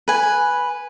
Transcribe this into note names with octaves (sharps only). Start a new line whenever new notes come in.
B4 G#5